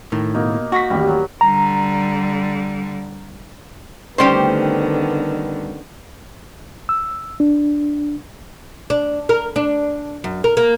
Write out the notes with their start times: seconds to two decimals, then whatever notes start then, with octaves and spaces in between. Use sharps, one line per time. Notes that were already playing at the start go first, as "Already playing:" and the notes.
0.12 A2 D#3
0.34 B2 A#3 D#4
0.72 F#4 C#6 A#6 B6
0.90 A1 D#2 G3
1.07 F#3
1.41 D3 G3 A#5
4.18 D2 D3 D#3 G3 B3 C#4 G4 C5
6.89 E6
7.40 D4
8.90 D4
9.29 A#4
9.56 D4
10.24 F#2
10.44 A#4
10.57 A#3